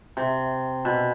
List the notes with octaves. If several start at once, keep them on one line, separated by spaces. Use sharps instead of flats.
C3
B2